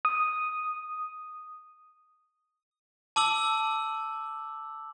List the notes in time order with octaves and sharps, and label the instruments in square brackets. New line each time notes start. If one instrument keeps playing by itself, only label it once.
[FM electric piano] D#6
[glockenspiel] A5 D6 E6 F#7